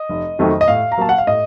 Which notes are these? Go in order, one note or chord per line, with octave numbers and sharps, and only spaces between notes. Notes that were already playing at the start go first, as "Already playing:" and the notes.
Already playing: D#5
F1
F2 D#3 F#3 A3
D#5
A2 F5
A#5
F#3 A#3 A5
F#5
F5
A2 D#5